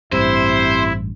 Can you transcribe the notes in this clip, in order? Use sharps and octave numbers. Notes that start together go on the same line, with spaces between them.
A1 G2 C3 E4 C5